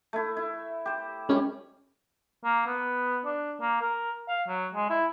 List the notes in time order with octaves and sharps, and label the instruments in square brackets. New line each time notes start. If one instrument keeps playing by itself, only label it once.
[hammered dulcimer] A3 E4
E4
G4 C5
[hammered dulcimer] F#2 G3 [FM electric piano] G#3 C#4
[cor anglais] A#3
B3
D4
A#3
A#4
F5
F#3
G#3
E4